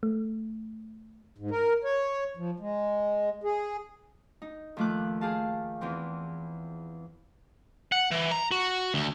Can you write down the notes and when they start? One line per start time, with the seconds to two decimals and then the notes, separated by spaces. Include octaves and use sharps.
0.03 A3
1.38 G#2
1.51 A#4
1.84 C#5
2.37 F3
2.60 G#3
3.44 G#4
4.42 D#4
4.77 D#2 F3 A3 F4 D6 F#6
5.21 G4 G#4 F5 A5
5.81 E2 E3 C4
7.92 F#5
8.12 E3
8.32 A#5
8.51 F#4
8.94 D2